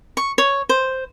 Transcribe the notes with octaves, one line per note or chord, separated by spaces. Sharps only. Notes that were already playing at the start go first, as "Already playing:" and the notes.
C#6
C#5
C5